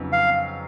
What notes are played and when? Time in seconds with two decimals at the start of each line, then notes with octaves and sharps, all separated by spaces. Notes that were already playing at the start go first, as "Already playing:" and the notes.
Already playing: F2 C#3 F#3 B3 D#4
0.12 F5